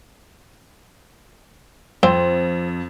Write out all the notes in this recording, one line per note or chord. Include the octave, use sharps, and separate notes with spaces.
F2 C4 C5